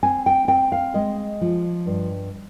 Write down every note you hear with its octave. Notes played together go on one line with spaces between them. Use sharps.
C4 G#5
G5
C4 G5
F5
G#3 D#5
F3
G2